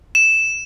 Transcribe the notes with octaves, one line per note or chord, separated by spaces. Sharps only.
E7